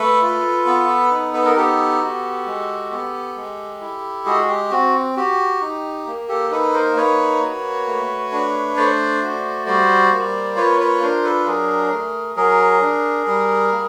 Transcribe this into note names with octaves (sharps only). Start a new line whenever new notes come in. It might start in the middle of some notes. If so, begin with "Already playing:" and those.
Already playing: A3 A4 B4
F4
B3
D#4
B4
A#4
B3 G4 A4
F#4
G#3
B3
G#3
E4
G#3 F#4 G#4
G4
C4 F#4
F#4 G4
D#4
A#3
G4 A4
D#4 A4 B4
A#4 C5
A#3 B4 C#5
F#4
A3
D4
A3 C5 D5
F#4
G3 C5 D5
A#3
F4 B4 C#5
B4 C#5
D4 A#4 C5
A4 B4
F#3 G#4 A#4
A3
F#3 G#4 A#4
D4
G3
A#3